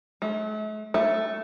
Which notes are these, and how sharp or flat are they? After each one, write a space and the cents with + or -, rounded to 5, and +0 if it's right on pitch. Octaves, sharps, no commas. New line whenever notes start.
A3 -45
A3 +0